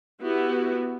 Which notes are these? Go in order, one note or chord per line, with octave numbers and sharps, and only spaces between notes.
B3 E4 F#4 G4